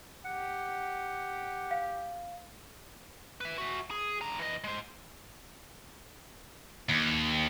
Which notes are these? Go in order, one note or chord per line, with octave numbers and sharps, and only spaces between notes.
G4 F#5
F5
B4 E5
F#4 E5
G#4
D3 A#5
E3 D#5
G#3 C5
D#2